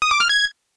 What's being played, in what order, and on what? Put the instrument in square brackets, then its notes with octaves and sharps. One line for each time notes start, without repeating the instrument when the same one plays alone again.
[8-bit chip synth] D#6
D6
F6
G#6